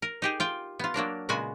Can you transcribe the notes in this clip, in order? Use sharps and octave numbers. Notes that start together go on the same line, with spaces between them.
A#4
D#4 G4 G#4
F4 G5
B3 F4
F#3 A#3 D4 A#4
A#2 C#3 G#3 B3 F#4 G#5